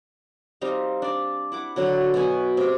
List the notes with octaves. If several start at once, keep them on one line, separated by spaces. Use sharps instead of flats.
G3 C4 D#4 F5
D4 D5
E4 F#5 D6
D3 F#3 F#5
B2 C#5 F#5 G#5
C3 G4